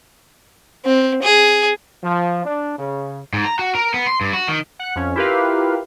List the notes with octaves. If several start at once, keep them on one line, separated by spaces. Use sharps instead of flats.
C4
G#4
F3
D4
C#3
G#2
A#5
F#4
A#4
B3
C6
G2
F#4
D#3
F#5 F#6
F2 C#4
E4 F4 G4 A#4 B4 F5